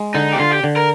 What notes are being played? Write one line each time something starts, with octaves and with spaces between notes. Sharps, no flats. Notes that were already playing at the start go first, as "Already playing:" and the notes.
Already playing: G#3
D3 D#4
G4
D3 F4
G4
D3
A#4